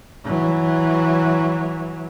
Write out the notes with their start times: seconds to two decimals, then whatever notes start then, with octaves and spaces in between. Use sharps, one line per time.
0.24 E3 F#3